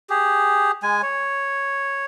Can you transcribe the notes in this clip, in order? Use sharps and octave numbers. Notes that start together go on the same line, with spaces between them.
G4 G#4
G#3 G#5
C#5